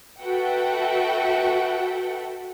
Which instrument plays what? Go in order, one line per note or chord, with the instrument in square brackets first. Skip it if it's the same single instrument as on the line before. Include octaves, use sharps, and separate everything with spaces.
[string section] F#4 A4 B4 E5 F#5 G5